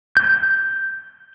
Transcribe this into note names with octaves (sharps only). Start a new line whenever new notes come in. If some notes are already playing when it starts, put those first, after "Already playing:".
G6